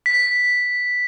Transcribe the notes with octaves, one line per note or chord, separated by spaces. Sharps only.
B6